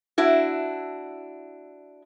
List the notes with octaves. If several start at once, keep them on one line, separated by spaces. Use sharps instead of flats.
D4 E4 F#4